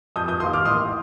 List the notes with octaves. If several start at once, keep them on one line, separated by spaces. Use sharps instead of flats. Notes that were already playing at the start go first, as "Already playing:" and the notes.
F2 D#6 G6
D#6 G6
D#3 A#3 C6 D#6
D6 F6
A1 C6 D#6